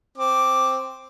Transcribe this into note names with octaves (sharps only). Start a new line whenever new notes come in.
C4 D6